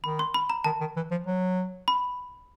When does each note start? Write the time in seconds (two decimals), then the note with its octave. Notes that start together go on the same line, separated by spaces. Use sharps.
0.03 D#3 B5
0.19 C6
0.34 B5
0.50 A#5
0.64 D#3 A5
0.80 D#3
0.96 E3
1.11 F3
1.27 F#3
1.88 B5